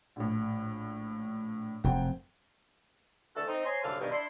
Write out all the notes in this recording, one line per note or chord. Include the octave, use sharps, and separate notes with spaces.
A#1 A2
F1 F#2 C4 F#5 G5
D3 E3 A3 F#4 A4
C4 D#4
C5 C#5 G#5 A#5 C6
C2 F#2 D3 E3 A4 F5
G2 B2 D#3
D4 E4 C6